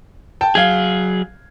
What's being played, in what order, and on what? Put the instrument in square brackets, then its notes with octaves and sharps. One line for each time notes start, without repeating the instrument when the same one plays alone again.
[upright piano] G5 A5
[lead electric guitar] F#3 G#4 [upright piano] F5 G#6